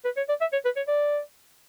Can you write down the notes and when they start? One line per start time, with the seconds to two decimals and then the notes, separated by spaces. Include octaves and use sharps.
0.05 B4
0.17 C#5
0.29 D5
0.41 E5
0.53 C#5
0.65 B4
0.76 C#5
0.88 D5